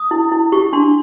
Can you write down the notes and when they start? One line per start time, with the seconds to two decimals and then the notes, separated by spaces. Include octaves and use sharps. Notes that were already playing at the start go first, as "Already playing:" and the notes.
Already playing: D#6
0.11 E4
0.32 E4
0.52 G4 C#6
0.73 D4 C6